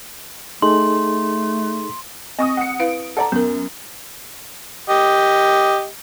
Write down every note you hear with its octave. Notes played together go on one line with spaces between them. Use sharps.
A3 D#4 G#4 A4 C6
C4 D#5 C#6 D#6
F#5 C#7
E4 B4 F5 D7
A4 D5 F#5 A#5
F#2 B3 A#4
G4 D#5